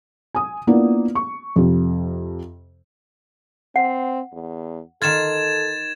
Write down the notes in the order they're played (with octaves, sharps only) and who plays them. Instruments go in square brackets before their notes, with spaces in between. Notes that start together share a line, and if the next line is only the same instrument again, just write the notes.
[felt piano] G#5 D#6
A#3 B3 D4 E4 F4
C#6
F2 C3
[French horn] C4 [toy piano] F#5
[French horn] E2
[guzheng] D#3 F4 [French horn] A4 [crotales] G#6 A6 E7